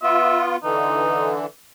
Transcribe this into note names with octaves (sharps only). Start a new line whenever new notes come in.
B3 F4 E5
D3 E3 D#4